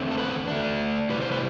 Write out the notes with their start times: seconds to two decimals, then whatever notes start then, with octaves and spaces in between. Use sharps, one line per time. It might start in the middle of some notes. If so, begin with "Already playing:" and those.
Already playing: E2 D3 A3 C4
0.11 A4
0.18 B4
0.48 D3 A3 D4
1.10 C3 E3 G3 B4
1.21 C5
1.32 B4